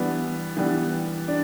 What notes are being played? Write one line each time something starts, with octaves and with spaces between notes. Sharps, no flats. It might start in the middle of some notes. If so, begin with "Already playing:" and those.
Already playing: E3 G3 B3 D4
E3 G3 B3 D4
D4